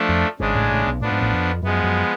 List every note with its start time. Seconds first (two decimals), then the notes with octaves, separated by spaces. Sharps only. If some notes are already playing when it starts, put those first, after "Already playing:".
Already playing: F3 A3 D4
0.09 F2
0.39 G#1 G#2 C#3 G#3 D4
0.55 A1 A2
0.71 A1 A2
0.85 B1 B2
1.01 A2 F3 B3 D4
1.11 G#2
1.21 A1 A2
1.33 F2
1.63 F#2 F3 G#3 B3
1.84 F#2